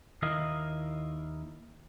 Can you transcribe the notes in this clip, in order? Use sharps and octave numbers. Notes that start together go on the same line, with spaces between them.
D#2 D#3 A#3 E4 D#5 F5